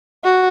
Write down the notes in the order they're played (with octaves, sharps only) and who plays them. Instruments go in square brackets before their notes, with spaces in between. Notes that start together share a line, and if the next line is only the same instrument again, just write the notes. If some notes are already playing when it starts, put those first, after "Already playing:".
[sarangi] F#4